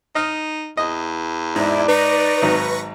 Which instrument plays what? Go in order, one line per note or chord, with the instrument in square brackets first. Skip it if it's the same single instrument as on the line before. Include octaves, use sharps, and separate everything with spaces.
[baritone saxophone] D#4 [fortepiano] D#5 F6
[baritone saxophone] E2 [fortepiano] D#5
[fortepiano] G#2 [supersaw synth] E4 [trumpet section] D5
[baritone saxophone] D#4 [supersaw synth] B4 C#6 A#6
[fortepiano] G#1 G#2 F#3